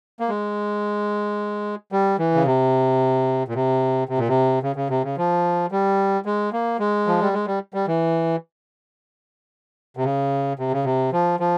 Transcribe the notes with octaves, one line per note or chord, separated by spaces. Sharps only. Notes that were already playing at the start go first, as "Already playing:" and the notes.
A#3
G#3
G3
E3
C#3
C3
A#2
C3
C3
A#2
C3
C#3
C#3
C3
C#3
F3
G3
G#3
A#3
G#3
F3
G3
G#3
G3
G3
E3
C3
C#3
C3
C#3
C3
F3
F3